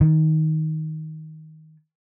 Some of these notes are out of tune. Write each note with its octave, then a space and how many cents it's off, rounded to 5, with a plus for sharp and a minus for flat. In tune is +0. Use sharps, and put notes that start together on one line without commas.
D#3 +15